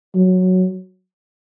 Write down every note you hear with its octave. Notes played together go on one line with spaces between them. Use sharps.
F#3